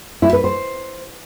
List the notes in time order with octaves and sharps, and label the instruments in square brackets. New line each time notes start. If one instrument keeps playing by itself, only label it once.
[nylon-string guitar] E4
B4
C5